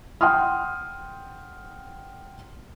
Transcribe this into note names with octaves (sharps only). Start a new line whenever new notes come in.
F#5 G5 C6 D#6 F6